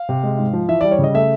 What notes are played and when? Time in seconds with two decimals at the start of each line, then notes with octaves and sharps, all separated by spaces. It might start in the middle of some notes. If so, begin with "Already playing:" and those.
Already playing: F5
0.09 C3
0.23 G#3
0.38 G#2
0.53 F3
0.69 E3 E5
0.81 G3 D5
0.91 C#5
0.99 C#3 D#5
1.14 A3 E5